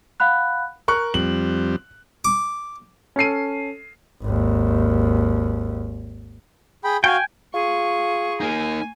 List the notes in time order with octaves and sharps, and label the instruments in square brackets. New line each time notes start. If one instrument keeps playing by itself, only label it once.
[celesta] F5 F#5 B5 F#6
[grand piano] A#4 C#6 F#6
[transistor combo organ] F2 G3 C4 [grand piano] F#7
[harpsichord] D6
[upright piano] C#4 A4 C7 D#7
[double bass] G#1 D#2
[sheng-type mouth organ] G#4 G5 B5
[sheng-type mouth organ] F#4 F5 [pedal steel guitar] G5 G#5
[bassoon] F4 [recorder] G#4 [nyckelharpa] C#6
[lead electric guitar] A#3 D#4 [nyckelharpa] G#5